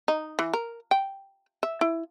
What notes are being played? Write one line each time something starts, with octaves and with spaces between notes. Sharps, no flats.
D#4
E3
A#4
G5
E5
E4